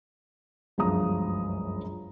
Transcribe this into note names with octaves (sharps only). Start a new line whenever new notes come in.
G1 C#2 F#2 F3 A#5 D#6